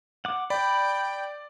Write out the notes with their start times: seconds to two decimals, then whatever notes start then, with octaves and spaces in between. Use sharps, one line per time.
0.25 F#5 D6
0.50 D5 G5 B5